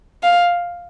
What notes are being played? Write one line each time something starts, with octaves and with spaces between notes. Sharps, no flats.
F5